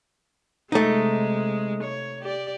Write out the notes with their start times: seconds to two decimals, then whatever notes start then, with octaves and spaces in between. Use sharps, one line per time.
0.72 C3 G#3 A3 D#4
1.83 C#5
2.21 G4 D5